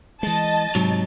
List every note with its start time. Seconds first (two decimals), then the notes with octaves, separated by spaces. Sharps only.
0.23 E3 G#3 D#5 A5 A6
0.75 G#2 C3 F#3